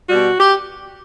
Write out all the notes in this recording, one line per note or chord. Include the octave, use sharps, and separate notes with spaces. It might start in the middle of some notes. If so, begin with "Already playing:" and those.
B2 G3 F#4
G4